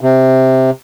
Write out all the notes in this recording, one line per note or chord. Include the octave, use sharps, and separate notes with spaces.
C3